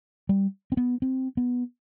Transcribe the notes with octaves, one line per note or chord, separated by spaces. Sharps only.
G3
C4
B3
C4
B3